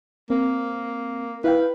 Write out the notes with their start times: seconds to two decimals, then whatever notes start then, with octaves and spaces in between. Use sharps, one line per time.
0.30 A#3 C4
1.44 E4 B4 F5 G5